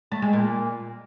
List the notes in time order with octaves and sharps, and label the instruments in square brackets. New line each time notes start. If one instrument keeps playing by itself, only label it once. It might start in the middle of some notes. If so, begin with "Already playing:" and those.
[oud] A3
G#3
A#2